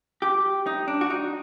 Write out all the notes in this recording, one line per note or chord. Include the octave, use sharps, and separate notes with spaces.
G4
D#4
D4
F#4
D#4